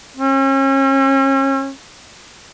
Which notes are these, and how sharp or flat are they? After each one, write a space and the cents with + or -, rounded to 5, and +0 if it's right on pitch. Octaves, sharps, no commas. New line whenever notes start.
C#4 -35